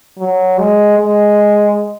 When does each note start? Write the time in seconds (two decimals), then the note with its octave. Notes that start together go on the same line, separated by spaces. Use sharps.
0.18 F#3
0.58 G#3
0.99 G#3